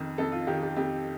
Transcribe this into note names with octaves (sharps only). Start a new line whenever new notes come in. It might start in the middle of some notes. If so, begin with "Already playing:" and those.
Already playing: F2 D#3
F2 A4
F4
D#3 G4
G4
F2 G4